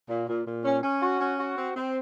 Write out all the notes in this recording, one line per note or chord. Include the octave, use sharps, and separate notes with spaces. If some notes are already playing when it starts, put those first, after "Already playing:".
A#2
A#2
A#2
C#4
C#4
F#4
C#4
F#4
C4
C4